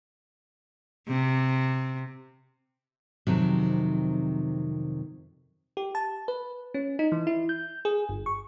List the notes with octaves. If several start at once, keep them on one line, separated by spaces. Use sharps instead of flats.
C3
F2 C3 D#3 F#3
G4
A5
B4
C#4
D#4
E3
E4
G6
G#4
G1
C#6